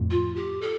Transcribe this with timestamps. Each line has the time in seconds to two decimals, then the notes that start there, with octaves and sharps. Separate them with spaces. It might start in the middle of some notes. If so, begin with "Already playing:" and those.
Already playing: F2 A2
0.10 F4
0.35 G4
0.61 A4